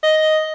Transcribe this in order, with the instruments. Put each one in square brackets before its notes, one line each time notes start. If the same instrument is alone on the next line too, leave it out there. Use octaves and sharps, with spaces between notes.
[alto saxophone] D#5